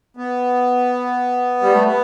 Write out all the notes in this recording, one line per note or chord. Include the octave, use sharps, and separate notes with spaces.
B3
G3
A3
B3